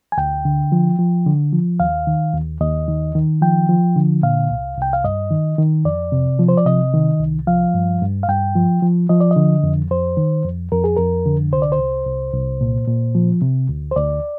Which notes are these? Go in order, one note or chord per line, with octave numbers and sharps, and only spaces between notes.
G#5
D2 G5
D3
F3
F3
D3
F3
D#2 F5
D#3
D#2
D#2 D#5
D#3
D#3
F3 G5
F3
D3
A#2 F5
C2
C2 G5
F5
G2 D#5
D#3
D#3
F2 D5
C3
F3
C5
D5
C3 D#5
D#3
C2
F3 F5
G2
G2
F5
G2 G5
F3
F3
F3 D#5
D5
D#5
D3
F2
F2 C5
D#3
F2
F2 A#4
G#4
F2 A#4
D3
C2 C5
D5
C5
C2
C2
C2
A#2
A#2
F3
C3
D2
C5
D2 D5